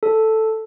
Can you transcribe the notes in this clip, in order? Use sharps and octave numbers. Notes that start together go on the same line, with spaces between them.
A4